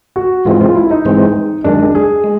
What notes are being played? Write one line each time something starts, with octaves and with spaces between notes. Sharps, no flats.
F#4
G#2 E3 G#3 C4 F4
F4
E4
D#4
G#2 E3 G#3 C4
F#2 D#3 G#3 D4
G#4
G#3